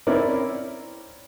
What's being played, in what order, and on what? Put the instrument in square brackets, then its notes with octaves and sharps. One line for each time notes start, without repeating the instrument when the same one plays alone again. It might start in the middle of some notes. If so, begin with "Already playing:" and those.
[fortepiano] C4 C#4 E4 A#4 D5